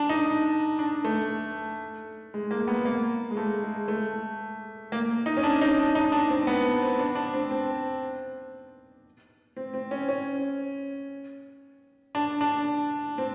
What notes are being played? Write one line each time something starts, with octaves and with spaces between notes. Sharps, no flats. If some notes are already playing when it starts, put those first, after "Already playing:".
Already playing: D4
D#4
D4
A3
G#3
A#3
B3
A#3
G#3
A3
G#3
A3
A#3
D#4
C#4
D4
D#4
D4
D#4
D4
C4
B3
C4
D4
D4
C4
C4
C4
C4
C#4
C#4
D4
D4
C4